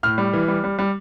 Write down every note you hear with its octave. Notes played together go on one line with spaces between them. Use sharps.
A2 F6
G3
E3
G3
G3
G3